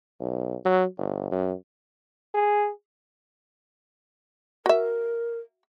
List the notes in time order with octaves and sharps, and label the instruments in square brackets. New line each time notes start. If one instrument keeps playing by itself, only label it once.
[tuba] B1
F#3
G1
F#2
[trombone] G#4
[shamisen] F#4 E5 [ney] A#4